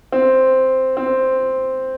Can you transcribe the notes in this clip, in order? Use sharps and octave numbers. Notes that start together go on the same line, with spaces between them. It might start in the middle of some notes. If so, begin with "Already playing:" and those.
C4
C4